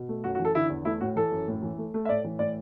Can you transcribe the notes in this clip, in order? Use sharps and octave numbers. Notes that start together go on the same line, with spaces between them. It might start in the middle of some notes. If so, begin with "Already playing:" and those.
Already playing: B2
A3
F#2 F#4
F#4
E3
A4
D3 E4
E2
A3 E4
A2 F#4
E3 A4
F#2
A2
E3
A3
A3
E5
A2 D5
E3
A2 D5